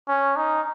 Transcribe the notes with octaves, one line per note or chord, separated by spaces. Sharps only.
C#4
D#4